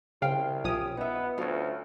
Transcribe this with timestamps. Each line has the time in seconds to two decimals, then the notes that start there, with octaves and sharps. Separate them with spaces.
0.22 C2 C#3 C5 F5 G5
0.64 B1 F3 C#4 G4 D#6
0.97 B3 D#4 E5
1.38 D2 C#4 F4